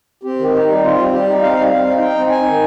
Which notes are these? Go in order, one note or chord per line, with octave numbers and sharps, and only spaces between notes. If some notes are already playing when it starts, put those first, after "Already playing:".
C4 G4
D#3
D#4 G4
G3
C4 F4
G3
G3 G4
D#4
C4 F5
G3
C4 F5
D#4
D#4 G5
C4
D#4 G#5
D#3